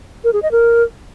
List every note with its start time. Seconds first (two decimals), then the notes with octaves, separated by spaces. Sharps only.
0.24 A#4
0.33 G#4
0.42 D#5
0.52 A#4